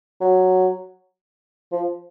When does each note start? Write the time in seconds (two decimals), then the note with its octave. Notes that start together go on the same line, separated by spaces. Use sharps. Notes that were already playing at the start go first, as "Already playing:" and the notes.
0.21 F#3
1.72 F3